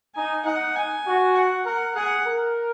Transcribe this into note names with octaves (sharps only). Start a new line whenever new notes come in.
D#4 G#5
D#4 F#5
G#5
F#4
F#5
A#4 F#5
G#4 F#5
A#4